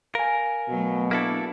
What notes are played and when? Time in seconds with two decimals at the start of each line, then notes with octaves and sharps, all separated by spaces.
0.15 A#4 F5 G#5
0.69 B2 F#3 A3
1.11 A#3 D4 E4 A4 D6